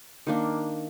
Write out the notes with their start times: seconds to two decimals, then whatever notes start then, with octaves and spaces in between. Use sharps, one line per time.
0.27 D#3 A#3 D4